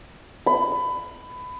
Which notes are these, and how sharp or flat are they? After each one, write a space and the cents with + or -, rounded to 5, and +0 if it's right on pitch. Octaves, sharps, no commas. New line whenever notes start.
B5 +20